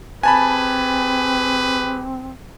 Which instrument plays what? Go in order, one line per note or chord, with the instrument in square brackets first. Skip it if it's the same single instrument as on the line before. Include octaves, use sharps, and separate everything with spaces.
[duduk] C4 [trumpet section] G4 G#4 B4 [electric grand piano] G#5 A5 B5